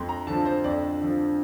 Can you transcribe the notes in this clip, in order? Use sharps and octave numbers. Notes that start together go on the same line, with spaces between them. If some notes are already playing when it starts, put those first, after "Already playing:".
Already playing: F2 C6
A#5
D3 F3 A5
C5
F2 D5
D3 F3